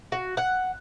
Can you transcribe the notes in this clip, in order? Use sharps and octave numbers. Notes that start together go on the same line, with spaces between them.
F#4
F#5